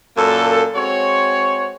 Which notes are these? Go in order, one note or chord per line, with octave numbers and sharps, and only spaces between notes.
F#2 A#2 A#3 A4
G#3 C4 F#4 C#5